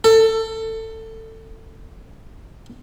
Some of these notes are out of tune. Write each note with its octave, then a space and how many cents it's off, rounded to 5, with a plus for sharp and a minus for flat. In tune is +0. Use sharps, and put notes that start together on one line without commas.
A4 +20